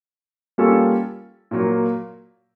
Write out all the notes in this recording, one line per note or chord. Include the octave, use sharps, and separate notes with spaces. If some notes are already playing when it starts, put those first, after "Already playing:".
G3 A#3 C#4 F4 A4
A#2 F#3 A#3